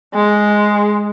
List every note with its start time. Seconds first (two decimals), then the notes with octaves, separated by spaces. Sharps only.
0.14 G#3